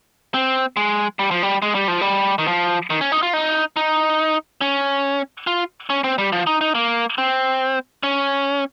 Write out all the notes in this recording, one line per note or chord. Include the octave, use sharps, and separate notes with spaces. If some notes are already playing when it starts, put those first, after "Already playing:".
C4
G#3
G3
F3
G3
G#3
G3
F3
G3
D#3
F3
D#3
C#4
D#4
F4
D#4
D#4
C#4
F4
C#4
C4
G3
F3
D#4
D#4
A#3
C4
C#4